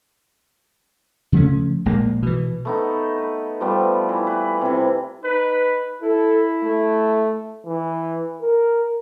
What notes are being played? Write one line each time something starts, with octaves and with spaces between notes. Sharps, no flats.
C#3 F3 A3 C#4
A#1 G#3 A#3
B2 E3
A3 B3 D#4
B4
F3 G3 A3 B3
E3
B4
C3 E3
D#4 B4
E4 A4
A3
E3
A#4